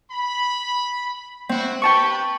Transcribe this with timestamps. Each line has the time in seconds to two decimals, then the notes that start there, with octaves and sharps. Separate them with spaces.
0.11 B5
1.49 C4 E4 F#4
1.82 G4 B4 G5 A5 B5 C#6